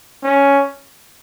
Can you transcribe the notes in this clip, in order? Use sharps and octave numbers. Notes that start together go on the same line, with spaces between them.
C#4